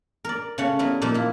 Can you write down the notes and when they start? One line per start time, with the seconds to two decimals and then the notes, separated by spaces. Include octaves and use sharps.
0.25 A#4 D5
0.58 C#3 A3 C#5 F#5
0.79 G3 B3 E4 A#4
1.02 A#2 F3 A#3 C4 D#4
1.14 A#3 E4